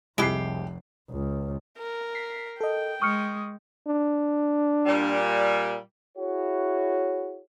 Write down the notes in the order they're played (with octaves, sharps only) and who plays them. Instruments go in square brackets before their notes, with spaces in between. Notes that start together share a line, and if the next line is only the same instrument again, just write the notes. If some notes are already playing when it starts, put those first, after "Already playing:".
[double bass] F1 [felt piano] C2 C7 [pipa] G#3 E4 G4
[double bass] C#2
[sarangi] A#4
[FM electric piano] B6 C7
[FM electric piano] A4 D#5 [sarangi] G5
[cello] G#3 [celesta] C#6 F6 C#7 [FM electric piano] D#6
[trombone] D4
[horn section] A#2 G3
[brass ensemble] E4 F#4 G#4 C#5